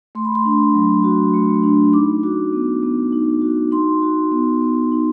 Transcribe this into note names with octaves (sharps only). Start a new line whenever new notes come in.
A3 C6
B5
C6
D4
F#3
F#4
A3
D4
D#4 D6
F#4
B3
B3
D#4
F#4
D#4 C6
F#4
B3
B3
D#4